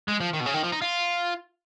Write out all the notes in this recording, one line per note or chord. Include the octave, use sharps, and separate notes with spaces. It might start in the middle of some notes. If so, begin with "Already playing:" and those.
G#3
F3
D#3
B2
C#3
D#3
F3
D#4
F4